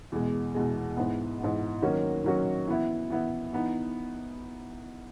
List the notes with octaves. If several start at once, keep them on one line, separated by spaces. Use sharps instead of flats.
E2 B2 G#3
E2 B2 G#3
G#2 E3 B3
G#2 E3 B3
D#3 F#3 A#3 C#4 F#4
D#3 F#3 A#3 C#4 F#4
E3 B3 E4
E3 B3 E4
E3 B3 D#4